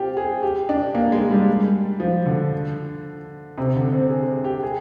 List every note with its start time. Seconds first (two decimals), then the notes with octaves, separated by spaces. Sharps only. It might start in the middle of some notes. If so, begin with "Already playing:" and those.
Already playing: C4 F4 G4
0.17 G#4
0.43 G4
0.69 D4
0.95 A#3
1.12 G#3
1.30 G3
2.00 F3
2.26 D3
3.58 C3
3.76 D3
3.93 C4
4.10 G#4
4.44 G4
4.63 G#4